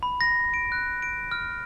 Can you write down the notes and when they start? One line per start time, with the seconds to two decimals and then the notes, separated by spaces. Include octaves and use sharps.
0.03 B5
0.21 A#6
0.54 D7
0.72 F#6
1.02 D7
1.32 F6